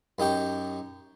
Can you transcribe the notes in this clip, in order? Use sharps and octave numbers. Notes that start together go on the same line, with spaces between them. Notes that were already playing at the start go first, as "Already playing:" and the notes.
F#2 D#4 G4 G5 C#6